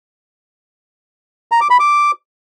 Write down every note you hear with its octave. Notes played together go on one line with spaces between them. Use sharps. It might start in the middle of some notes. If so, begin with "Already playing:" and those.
A#5
D6
B5
D6